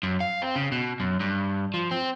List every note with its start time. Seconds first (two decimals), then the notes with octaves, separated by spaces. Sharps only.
0.03 F#2
0.20 F5
0.42 C4
0.56 C#3
0.72 B2
1.00 F#2
1.20 G2
1.74 F3
1.91 C4